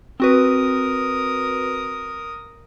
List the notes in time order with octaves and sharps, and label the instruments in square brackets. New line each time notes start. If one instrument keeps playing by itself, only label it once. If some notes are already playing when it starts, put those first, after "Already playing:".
[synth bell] C4 F#4 B4 [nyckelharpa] A#4 D#6